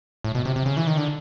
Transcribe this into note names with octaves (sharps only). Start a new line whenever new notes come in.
A2
B2
C3
C3
C#3
E3
D#3
D3